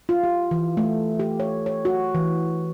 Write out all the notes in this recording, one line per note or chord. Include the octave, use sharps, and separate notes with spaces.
F4
G4
E3
A3
G4
C#5
C#5
F#4
E3